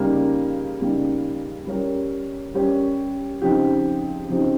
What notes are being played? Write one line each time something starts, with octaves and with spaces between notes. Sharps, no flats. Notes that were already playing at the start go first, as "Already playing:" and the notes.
Already playing: C#3 G3 A#3 D#4
C#3 G3 A#3 D#4
G3 C#4 G4 A#4 C#5
G3 C#4 G4 A#4 C#5
C#3 F3 C4 D#4 G4
C#3 F3 C4 D#4 G4